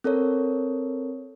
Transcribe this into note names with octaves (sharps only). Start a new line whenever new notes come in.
C4 A4 A#4 C#5